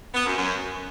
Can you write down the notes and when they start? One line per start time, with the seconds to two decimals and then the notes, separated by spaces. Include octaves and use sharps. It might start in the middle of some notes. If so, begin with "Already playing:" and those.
0.15 B3
0.26 F#2
0.38 F#2